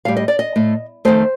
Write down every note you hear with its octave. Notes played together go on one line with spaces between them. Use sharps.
A2 G3 F5
D#5
D5
D#5
A2 A3
F2 D#3 A3 C5